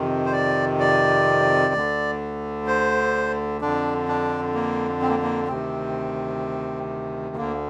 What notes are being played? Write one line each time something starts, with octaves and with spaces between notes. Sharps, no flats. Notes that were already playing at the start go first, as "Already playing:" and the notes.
Already playing: F2 C3 D#3
C5
D5
D5
D2 D3
C5
F2 D3 D4
D4
A#3
C4
A#3
A#3
D2 C3 D#3 C4
D2 D3 A#3